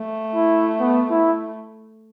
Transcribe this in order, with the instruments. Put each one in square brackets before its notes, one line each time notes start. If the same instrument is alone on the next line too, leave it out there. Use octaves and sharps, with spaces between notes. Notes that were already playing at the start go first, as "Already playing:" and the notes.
Already playing: [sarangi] A3
[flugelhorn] E4
B3
E4